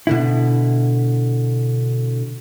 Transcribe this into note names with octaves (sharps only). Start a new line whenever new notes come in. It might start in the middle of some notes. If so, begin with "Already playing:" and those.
B2 D3 E4